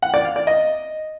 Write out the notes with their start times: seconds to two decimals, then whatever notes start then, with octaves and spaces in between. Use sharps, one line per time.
0.02 F#5
0.14 D5
0.25 F5
0.36 D5
0.47 D#5